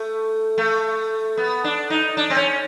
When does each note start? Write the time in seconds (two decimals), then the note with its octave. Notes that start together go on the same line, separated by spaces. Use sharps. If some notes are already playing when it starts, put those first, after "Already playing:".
Already playing: A3
0.58 A3
1.37 B3
1.64 D4
1.90 D#4
2.17 D4
2.30 C4
2.36 C#4